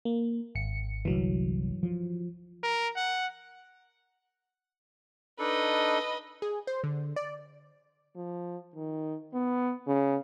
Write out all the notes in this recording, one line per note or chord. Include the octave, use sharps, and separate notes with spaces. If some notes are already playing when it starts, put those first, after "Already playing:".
A#3
G#1 C#7
G1 C2 E3 F#3
F3
A#4
F#5
D4 D#4 A4 B4 D#5
G#4
C5
D3
D5
F3
D#3
B3
C#3